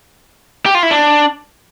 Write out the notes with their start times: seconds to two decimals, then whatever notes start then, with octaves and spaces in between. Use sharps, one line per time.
0.66 G4
0.75 F4
0.83 E4
0.91 D4